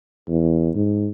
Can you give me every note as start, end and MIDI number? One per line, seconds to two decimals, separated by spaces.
0.28 0.70 40
0.75 1.09 44